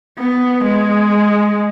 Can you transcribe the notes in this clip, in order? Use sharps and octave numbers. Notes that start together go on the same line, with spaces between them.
B3
G#3